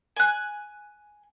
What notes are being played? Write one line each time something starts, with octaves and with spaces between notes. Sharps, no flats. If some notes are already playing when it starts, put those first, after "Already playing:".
G#5 F#6